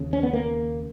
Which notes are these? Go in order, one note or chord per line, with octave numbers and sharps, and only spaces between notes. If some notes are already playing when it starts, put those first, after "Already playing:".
Already playing: D#2 C#3
C#4
B3
A#3